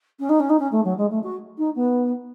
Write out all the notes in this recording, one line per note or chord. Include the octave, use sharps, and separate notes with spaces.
C#4
D#4
C#4
D#4
C#4
A3
F#3
G#3
A3
F#4
D#4
B3